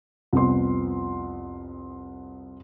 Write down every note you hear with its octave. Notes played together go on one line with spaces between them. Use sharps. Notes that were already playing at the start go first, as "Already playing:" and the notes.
C2 F2 B3 C6